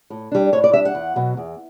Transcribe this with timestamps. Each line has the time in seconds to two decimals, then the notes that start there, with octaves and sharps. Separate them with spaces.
0.10 A2
0.32 G3 D4
0.53 A2 C#5
0.64 D5
0.73 G3 D4 E5
0.85 F#5
0.95 E2
1.16 B2 F#3
1.37 E2